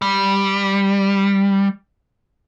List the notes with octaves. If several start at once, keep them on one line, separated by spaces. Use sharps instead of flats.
G3